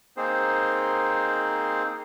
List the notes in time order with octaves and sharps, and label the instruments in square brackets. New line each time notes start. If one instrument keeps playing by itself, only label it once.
[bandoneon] A#3 C4 D#4 G#4 C5